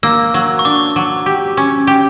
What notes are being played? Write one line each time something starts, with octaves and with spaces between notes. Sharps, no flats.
A#3 E6
F#3
C#6
D4 D6
F#3
G4
C#4
G4